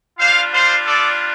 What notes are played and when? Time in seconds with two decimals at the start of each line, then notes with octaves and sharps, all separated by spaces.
0.19 G3 D4 F4 C5 F5
0.52 C5 F5
0.85 A4 D5